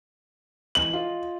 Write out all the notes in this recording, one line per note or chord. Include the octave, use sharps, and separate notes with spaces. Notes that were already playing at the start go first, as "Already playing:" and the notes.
E3 D#5 F#7
F4 D#5